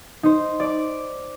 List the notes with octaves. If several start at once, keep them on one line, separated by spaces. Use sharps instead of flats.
D#4 C5
D5 D6